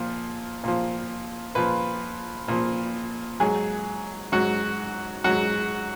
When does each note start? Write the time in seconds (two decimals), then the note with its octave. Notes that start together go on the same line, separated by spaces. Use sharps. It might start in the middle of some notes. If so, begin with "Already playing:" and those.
Already playing: A#2 F3
0.64 A#2 F3
1.55 A#2 F3 B4
2.48 A#2 F3
3.40 G#2 F#3 G#4
4.32 G#2 F#3 F#4
5.24 G#2 F#3 F#4